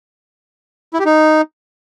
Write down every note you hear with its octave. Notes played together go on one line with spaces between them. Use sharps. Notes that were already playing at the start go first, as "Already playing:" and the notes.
E4
G4
D#4